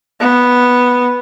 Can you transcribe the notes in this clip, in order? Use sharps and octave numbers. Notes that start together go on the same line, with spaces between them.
B3